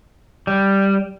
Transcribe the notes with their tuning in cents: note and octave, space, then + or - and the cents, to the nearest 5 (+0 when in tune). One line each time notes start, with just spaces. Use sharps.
G3 +0